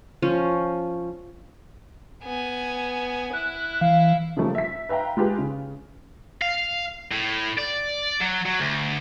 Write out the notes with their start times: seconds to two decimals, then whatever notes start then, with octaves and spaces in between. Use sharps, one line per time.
0.22 F3 C#4
2.24 B3 G#5
3.33 E4 F#6
3.81 E3 F5
4.37 C#3 F3 G3 A3 A#3 C#4
4.55 E5 B6
4.89 B4 E5 F5 G5 A#5
5.17 G#3 F4 G4 B4
5.38 C#3
6.42 F5
7.11 A2
7.58 D5
8.20 F#3
8.46 F#3
8.60 D2